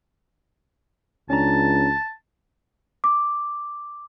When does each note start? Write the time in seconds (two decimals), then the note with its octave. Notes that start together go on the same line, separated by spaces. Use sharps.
1.30 C#2 C#4 D4 A5 A#5
3.04 D6